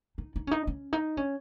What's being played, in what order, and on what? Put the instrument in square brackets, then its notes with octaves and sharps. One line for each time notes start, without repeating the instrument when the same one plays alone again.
[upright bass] D#4
D#4
C#4
D#4
C#4
D#4
C#4